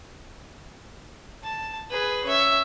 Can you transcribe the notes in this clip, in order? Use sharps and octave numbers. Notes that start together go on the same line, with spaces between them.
A5
G#4 B4
C#4 E5